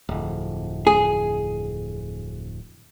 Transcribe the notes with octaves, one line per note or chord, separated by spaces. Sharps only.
D1 F2
G#4